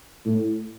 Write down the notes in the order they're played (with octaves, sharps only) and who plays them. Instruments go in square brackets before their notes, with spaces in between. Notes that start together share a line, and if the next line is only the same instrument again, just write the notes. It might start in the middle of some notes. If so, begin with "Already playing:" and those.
[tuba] A2